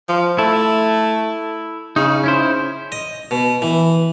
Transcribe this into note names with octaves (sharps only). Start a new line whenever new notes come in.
F3
A3 E4
C#3 D#4
C#4 E4 C5
D#5
B2
E3